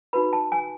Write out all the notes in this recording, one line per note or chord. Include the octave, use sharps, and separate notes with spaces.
D#4 F#4 B4 B5
A5
G#5